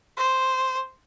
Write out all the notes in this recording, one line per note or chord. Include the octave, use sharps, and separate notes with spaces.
C5